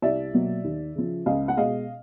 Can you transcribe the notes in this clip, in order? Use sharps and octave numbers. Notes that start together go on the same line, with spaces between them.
C2 D5 E5
B2 F#3 A#3
D#2
C#3 F3
C#2 D#5 F5
F#5
B2 G#3 D#5 F5